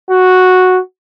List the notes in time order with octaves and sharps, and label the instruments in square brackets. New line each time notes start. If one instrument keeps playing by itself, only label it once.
[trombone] F#4